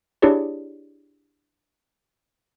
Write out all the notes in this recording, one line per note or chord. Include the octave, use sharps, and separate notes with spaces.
D4 E4 G4 G#4 C#5 D5